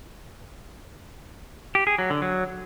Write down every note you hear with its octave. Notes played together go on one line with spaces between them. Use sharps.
G4
G#4
F#3
D3
F#3